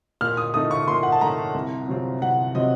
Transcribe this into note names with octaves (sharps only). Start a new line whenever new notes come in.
A#2 F6
D#6
A3 D#4 D#6
C#6
A#2 C6
F#5
A5
A3 D#4 A#5
C2
C3 F#3 C4 F4
C2 F#5
C3 F#3 C4 F4 D#5